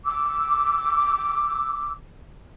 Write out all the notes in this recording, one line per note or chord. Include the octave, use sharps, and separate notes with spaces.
D6 E6